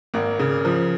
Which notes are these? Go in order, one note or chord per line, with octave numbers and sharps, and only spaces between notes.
G#1 A#3
C#3
F3